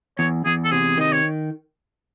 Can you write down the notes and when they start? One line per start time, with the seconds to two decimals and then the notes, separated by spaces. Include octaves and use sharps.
0.19 E2 C#5
0.45 E2 G#4
0.65 A4
0.71 C3 G#4
0.98 D#3 D#5
1.12 C#5